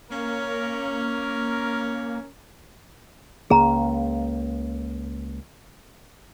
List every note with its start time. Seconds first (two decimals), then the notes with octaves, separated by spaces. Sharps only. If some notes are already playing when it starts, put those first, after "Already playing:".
0.10 A#3 C#4 A#4
3.50 C#2 C#3 A#3 G#4 A#5